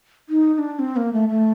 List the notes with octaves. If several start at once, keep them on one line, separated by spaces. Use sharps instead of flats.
D#4
D#4
D4
C4
A#3
A3
A3